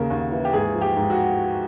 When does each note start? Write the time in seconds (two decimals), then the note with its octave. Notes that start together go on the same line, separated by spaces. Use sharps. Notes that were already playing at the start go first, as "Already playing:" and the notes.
Already playing: D#2 C#3 A#4
0.10 D#2
0.32 E3
0.45 G4
0.53 G#2 G#4
0.74 F3
0.81 G4
0.96 G#2
1.10 F#4